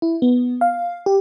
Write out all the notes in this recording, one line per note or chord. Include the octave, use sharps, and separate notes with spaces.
E4
B3
F5
G4